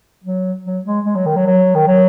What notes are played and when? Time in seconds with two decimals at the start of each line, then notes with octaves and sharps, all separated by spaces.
0.24 F#3
0.65 F#3
0.85 G#3
1.05 G#3
1.16 F#3
1.26 D#3
1.36 F#3
1.47 F#3
1.75 D#3
1.87 F#3